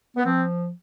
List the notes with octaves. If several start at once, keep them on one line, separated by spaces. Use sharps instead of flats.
B3
F3 C4